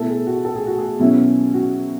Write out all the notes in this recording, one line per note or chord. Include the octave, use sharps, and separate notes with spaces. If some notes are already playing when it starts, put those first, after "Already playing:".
Already playing: B2 A3 E4 A4
G#4
F#4
A4
G#4
F#4
G#4
B2 F#3 C#4 E4
F#4